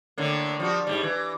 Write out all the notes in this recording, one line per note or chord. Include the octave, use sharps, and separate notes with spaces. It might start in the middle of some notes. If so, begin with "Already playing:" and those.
A2 D3 A#3
F3 G3 F#4
G#2 G3
E3